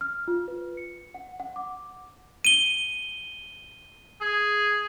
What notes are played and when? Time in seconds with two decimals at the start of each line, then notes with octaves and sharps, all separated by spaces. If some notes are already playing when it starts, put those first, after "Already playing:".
0.01 F6
0.28 F4
0.48 B4
0.77 C#7
1.14 F#5
1.40 F#5
1.56 D6
2.45 D#7 G7
4.21 G#4